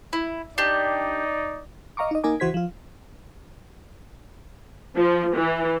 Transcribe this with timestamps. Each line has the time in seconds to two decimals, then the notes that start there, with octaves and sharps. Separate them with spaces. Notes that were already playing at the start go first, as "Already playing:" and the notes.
0.13 E4
0.58 D4 D#4 G4 D5
1.97 D#5 F5 A#5 C#6 D6
2.11 D#4 D#5
2.24 A#3 D#4 A#4 G#5 D6
2.40 C#2 E3 F#4 C5 G#6 B6
2.54 F3 F4
4.96 F3
5.35 E3